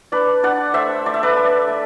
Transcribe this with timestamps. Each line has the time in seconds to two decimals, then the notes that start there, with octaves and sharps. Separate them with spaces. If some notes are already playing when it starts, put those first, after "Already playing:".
0.12 D4 B4 D5
0.43 D4 D5 F#5
0.74 A3 C5 E5
1.06 A3 D5
1.14 E5
1.23 B4 D5
1.37 D4
1.68 A3